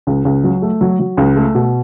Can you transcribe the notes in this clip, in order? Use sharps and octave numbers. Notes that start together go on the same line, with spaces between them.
C#2
C#2
F#3
A3
F#3
F#3
C#2
A3
B2